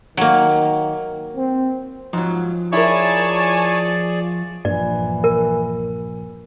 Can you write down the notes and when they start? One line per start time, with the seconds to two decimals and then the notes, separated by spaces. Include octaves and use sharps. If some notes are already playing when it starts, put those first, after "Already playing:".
0.17 D#3 F#3 A#3
1.36 C4
2.13 G#2 F3 F#3
2.73 E4 G#4 A#4 C#5 D5 G#5 A5
4.65 A#1 G2 A#2 E3 D5
5.24 A#4